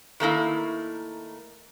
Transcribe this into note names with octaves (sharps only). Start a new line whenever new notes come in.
D#3 A3 A#3 E4